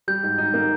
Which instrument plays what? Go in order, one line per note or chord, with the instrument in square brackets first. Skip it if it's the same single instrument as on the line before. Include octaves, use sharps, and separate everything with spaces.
[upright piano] G3 [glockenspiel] G6
[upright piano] G#2
D#4
A#3